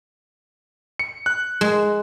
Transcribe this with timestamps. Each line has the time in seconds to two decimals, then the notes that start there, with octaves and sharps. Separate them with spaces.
0.99 C#7
1.26 F#6
1.61 G#3